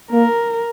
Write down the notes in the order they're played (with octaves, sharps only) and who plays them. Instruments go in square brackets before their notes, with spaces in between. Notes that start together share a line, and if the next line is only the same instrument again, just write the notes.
[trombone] A#3 [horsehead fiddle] A#4